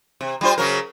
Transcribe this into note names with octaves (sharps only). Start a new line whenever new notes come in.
C3
G3 F4 C5
C#3 F#3 A#4